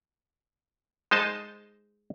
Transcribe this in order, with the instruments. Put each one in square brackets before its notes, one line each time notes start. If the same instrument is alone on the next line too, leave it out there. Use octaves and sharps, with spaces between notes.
[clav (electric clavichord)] G#3 D#4 C5 D#5 A5